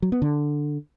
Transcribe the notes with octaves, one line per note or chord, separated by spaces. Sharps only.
F#3
B3
D3